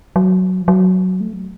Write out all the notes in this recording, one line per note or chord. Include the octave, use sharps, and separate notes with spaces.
F#3
F3
F#3
A3
F#3